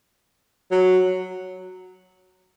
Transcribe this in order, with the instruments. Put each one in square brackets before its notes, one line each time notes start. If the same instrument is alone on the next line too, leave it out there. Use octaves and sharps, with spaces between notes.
[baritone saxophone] F#3